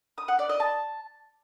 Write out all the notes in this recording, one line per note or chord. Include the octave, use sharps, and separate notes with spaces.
D#6
F#5
D5
D#5
A5